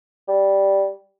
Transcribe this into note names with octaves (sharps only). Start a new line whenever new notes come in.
G3